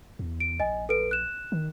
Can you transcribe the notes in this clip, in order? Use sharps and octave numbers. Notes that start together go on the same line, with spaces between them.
E2
D7
A#1 D#5 G#5
A4 B4 D7
F#6 E7
D#3